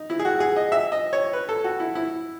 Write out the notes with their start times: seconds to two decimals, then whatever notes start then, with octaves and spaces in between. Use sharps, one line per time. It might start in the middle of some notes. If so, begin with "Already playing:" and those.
Already playing: D#4
0.10 E4
0.19 G#4
0.25 F#4
0.40 G#4
0.56 D#5
0.72 E5
0.92 D#5
1.13 C#5
1.33 B4
1.49 A4
1.64 F#4
1.80 E4
1.95 E4